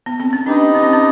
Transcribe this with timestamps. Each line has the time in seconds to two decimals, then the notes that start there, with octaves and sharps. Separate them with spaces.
0.06 B3
0.20 C4
0.33 C#4
0.46 D4 D#4 G4 B4 D#5
0.75 C#4
0.84 C4
0.93 C#4